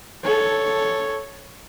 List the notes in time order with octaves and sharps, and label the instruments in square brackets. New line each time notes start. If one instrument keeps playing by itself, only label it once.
[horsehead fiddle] A4 C#5